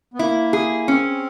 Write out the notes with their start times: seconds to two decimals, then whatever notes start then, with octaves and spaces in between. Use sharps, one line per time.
0.14 B3
0.19 A#3 E4
0.53 G#4
0.88 C4 C#4